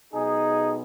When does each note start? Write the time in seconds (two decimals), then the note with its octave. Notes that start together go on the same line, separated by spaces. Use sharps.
0.13 B1 B2 D#4 G#4